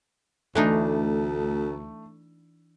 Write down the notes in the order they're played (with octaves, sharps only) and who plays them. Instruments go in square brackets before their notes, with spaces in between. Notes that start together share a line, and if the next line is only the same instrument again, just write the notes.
[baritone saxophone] D2 [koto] E3 D4 D#4 [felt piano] A3